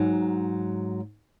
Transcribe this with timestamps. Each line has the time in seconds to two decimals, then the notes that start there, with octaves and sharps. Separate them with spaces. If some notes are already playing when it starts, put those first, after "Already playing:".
Already playing: G#2 F#3